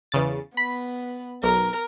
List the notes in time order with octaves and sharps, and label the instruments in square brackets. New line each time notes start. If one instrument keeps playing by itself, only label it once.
[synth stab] E2 C#3 A6
[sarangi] B3 [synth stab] B5
[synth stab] B1 [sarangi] A#4